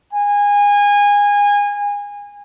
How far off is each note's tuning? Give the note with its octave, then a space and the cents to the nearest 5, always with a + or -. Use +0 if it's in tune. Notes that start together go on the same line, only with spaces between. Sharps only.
G#5 -25